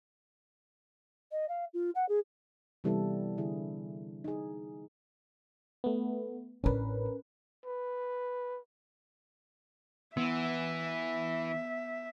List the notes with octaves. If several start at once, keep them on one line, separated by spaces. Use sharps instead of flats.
D#5
F5
F4
F#5
G#4
C3 E3 G3 B3 E4 A4
D3 E4 G#4
D#4 G#4
A3 B3
A1 C#4 D4 A#4 B4
B4
E3 B3 E5